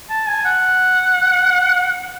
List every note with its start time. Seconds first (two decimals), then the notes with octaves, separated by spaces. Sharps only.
0.10 A5
0.28 G#5
0.45 F#5